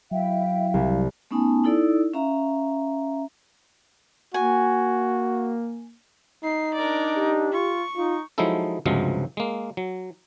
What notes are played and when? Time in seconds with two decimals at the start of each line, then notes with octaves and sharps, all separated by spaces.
0.11 F#3 E4 E5 F5 G5
0.74 C2
1.31 A3 B3 C#4 D#4 G#5 A5
1.64 D#4 E4 A4 D5 E6
2.14 C#4 E5 F5 A#5
4.34 A#3 F#4 G#5
6.44 D#4 C7
6.74 D4 A#4 D5
7.16 G4
7.53 F4 C#6
7.96 D#4 F4
8.38 F3 F#3 G#3 D#4 E4 A4
8.86 C#2 G2 C3 F3 F#3 G#3
9.37 G#3 A#3
9.77 F#3